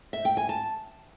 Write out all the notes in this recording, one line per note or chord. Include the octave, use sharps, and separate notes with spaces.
E5
G5
G#5
A5